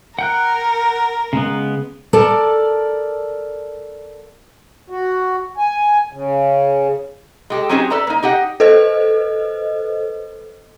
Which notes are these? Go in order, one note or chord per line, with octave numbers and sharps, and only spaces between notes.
A#4 F#5 G5 F#6
C#3 G#3 B3
A4 A#4 D5 A5
F#4
G#5
C#3
G#3 G4 A4
F#3 C4 C#4 D#4 G4 G#4
A4 B4 D5 E5 A#5
A#3 D#4
D#4 G4 D#5 F#5
A4 B4 C5 D#5